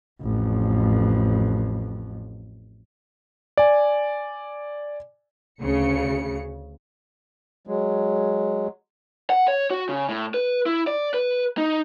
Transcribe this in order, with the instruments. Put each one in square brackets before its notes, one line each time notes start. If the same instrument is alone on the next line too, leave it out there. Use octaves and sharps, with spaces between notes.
[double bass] A1 F2
[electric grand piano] D5 G#5
[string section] D2 C#3 C#7
[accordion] F#3 G#3
[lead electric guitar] F#5
C#5
F#4
C#3
A2
B4
E4
D5
B4
D#4